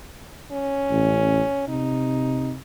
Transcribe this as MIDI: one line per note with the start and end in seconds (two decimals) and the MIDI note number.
0.51 1.67 61
0.91 1.42 33
1.68 2.58 48
1.68 2.53 63